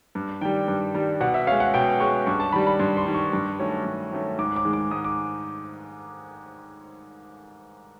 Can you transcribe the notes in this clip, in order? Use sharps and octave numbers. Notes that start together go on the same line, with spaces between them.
G2
D#3 G3 G5
G2
D#3 G3
B2 F#5
E5
G#3 C#4 F5
F#5
B2 G5
G#3 C#4 C#6
G2 C#6
A5
D#3 G3 B5
B5
G2 C6
C6
D#3 G3
C#6
G2
D#3 F#3 A3 C#4
G2
D#3 F#3 A3 C#4
G#2 D6
D6
D#3 G#3
D6
G#2 D#6
D6